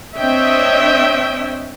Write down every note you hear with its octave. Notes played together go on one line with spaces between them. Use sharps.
C4 D4 C#5 D#5 E5 G5